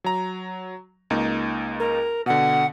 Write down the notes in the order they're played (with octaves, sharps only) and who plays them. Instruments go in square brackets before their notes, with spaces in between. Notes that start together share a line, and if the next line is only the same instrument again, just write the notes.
[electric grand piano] F#3 A#5
C#2 A#3 D#4
[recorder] A#4
[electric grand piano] B2 D3 [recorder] F#5